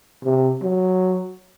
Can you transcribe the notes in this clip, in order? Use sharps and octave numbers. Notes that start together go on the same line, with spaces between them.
C3
F#3